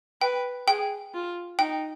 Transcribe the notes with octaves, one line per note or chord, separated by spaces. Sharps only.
B4 G5
G#4 G5
F4
D#4 G5